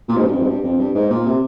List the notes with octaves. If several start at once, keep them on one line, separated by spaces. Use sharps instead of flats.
A#2
G#2
G2
F2
G#2
G2
F2
G2
G#2
A#2
C3